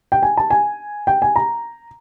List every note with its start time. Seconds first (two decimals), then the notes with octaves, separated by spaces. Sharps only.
0.12 G5
0.23 G#5
0.37 A5
0.50 G#5
1.07 G5
1.22 G#5
1.36 A#5